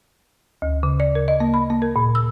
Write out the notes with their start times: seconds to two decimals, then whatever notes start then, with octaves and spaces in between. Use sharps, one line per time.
0.62 D2
0.83 C#3
1.00 D5
1.15 A#4
1.28 D#5
1.40 A#3
1.54 B5
1.70 A#3
1.82 A#4
1.96 A#2
2.15 E6